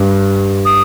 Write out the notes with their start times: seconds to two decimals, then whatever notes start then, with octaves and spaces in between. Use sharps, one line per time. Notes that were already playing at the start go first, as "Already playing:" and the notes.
Already playing: G2
0.65 D#6